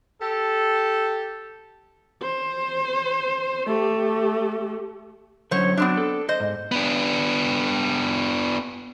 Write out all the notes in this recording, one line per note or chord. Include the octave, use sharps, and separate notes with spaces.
G4 A4
C5
A3 G4
D3 F#3 C#4 C5 C#5
F#3 B3 C4 D4
A4
C5 D#5
G#2
B3 D4